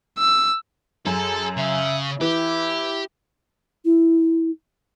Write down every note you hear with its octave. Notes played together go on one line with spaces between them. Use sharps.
E6
F#2 G#4 A4
C#3 E5
E3 E4 G4
E4